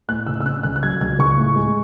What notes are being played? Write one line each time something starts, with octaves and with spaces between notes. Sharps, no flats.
A2 F#6
C#3 E6
E6
C#4 F#6
C#2 F#6
F#6
F#3 G#6
C#2 G#6
C#2 C#6
A2
G#3